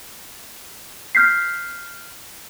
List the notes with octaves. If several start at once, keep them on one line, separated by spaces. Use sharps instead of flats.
F6 G6 B6 C7